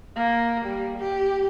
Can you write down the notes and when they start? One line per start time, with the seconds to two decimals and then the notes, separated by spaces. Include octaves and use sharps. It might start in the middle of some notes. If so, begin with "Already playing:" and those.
0.16 A#3
0.66 G3
0.98 G4